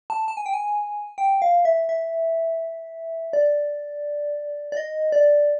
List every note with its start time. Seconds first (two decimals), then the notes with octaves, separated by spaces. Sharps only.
0.10 A5
0.28 A5
0.37 G#5
0.46 G5
0.54 G#5
1.18 G5
1.42 F5
1.65 E5
1.89 E5
3.33 D5
4.72 D5
4.77 D#5
5.12 D5